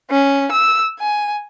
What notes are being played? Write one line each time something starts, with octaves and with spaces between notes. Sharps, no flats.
C#4
E6
G#5